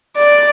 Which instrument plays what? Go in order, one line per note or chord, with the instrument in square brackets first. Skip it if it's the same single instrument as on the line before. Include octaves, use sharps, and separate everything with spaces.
[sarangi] D5